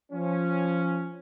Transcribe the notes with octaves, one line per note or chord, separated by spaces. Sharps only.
F3 C#4